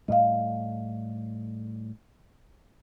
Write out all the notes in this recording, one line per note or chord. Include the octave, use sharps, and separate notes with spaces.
A2 G3 D#5 F5